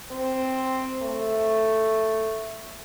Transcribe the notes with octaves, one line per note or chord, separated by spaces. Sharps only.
C4
A3